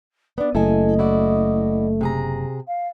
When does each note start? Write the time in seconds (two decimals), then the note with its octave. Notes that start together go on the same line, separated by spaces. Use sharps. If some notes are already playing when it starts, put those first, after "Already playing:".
0.38 B3 D4 D5
0.55 F#1 A3 E4 A4 D#5 G#5
0.99 E4 F#4 D5
2.01 C3 G#4 A#5
2.67 F5